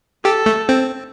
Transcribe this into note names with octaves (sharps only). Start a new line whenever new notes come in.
G4 A4
A3
C4